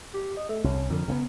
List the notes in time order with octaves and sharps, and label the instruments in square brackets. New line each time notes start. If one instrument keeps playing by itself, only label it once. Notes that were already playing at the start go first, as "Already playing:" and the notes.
[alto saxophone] G4
D#5
A3
[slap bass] C2 [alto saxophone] C#4
[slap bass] F2 D3 [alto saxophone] A#4
[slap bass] C#3 A#3 B3